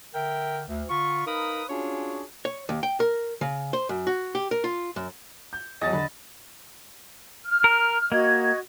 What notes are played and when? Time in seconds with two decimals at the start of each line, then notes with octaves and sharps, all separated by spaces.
0.14 D3 A#4 E5 G5
0.68 D2
0.90 D3 F4 B5 C#6
1.26 D#4 A#4 B4 F5 B5 D#6
1.69 C#4 D4 F4 F#4 G#4 C#5
2.45 C#5
2.69 D#2
2.83 G5
3.00 A#4
3.41 C#3
3.73 C5
3.89 F#2
4.07 F#4
4.35 G4
4.51 A#4
4.64 F4
4.96 F#2
5.53 G6
5.81 E2 F#3 D#5 A5
5.93 D3 B5
7.46 F6
7.64 A#4
8.12 A#3 F#4 D#5 G#6